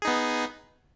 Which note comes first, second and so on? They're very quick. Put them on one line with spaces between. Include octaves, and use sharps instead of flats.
G#4 D#4 B3